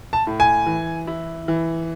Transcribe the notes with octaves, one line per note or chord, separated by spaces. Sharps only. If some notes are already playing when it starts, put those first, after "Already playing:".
A5
A2
G#5
E3
E4
E3